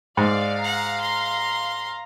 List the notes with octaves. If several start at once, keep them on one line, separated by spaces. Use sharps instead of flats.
G#2 D5 F5
F#5 A#5
C6